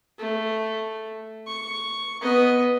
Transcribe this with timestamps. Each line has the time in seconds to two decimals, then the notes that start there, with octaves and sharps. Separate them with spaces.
0.19 A3
1.47 C#6
2.21 B3 D#5